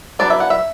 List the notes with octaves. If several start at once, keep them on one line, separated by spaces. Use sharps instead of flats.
F#3 B3 D4 D5
E5
F#5
E5